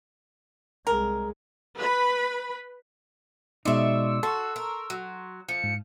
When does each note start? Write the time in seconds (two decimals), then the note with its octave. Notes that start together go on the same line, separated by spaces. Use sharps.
0.87 C2 G#3 A#4
1.76 B4 B5
3.65 B2 G#3 D#4 D5 E5 C6 E6 C#7
4.23 F#4 A4 C6 C#6
4.56 A#4
4.90 F#3
5.49 F3 C#7
5.64 G#2